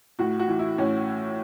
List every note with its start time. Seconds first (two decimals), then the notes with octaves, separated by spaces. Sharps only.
0.19 A2 F#4
0.39 F#4
0.48 E3
0.59 E4
0.78 A2 C#4